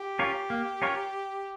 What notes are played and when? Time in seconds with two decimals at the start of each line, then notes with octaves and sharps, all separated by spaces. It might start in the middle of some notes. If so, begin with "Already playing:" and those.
Already playing: G4
0.19 C#4 F4 A#4 C#5
0.50 A#3
0.82 C#4 F4 A#4 C#5